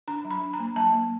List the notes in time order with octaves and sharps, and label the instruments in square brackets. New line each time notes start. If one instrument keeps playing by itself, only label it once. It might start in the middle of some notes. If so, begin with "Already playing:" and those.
[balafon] D4 A#5
F#3
B5
D4
A#5
A#3
F#3 A5
A#3